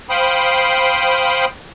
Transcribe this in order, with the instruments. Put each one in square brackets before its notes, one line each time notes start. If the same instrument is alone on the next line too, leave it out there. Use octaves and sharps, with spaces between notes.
[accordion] C5 F5 G5 B5 D#6